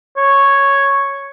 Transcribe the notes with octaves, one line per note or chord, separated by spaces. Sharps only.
C#5